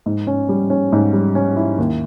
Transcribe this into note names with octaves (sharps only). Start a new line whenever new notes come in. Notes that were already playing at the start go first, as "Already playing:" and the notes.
G#2
C#4
G3
C#4
G#2
G3
C#4
E4
D#2